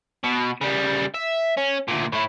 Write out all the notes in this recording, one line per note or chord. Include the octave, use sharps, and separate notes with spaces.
B2
C#3 G3
E5
C#4
D2 A#2
A2 E4